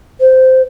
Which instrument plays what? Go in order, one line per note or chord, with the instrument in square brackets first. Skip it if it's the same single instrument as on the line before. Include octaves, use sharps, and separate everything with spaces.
[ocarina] C5